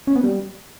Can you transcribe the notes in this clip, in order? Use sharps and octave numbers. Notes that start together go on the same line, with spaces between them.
C#4
B3
G3